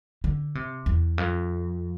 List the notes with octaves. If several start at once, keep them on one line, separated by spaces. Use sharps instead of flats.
D3
C3
E2
F2